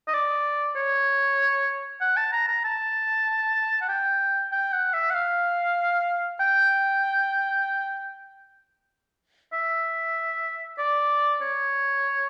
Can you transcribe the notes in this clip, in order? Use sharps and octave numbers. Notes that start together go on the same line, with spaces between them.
D#5
D5
C#5
F#5
A5
A#5
A#5
A5
F#5
G5
G5
F#5
E5
F#5
F5
G5
E5
D5
C#5